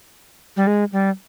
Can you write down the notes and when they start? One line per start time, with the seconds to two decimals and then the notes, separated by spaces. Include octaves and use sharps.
0.57 G3
0.67 G#3
0.92 G3